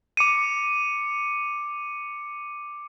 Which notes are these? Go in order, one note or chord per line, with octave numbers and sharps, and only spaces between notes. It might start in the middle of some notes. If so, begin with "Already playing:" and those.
D6 C#7 D#7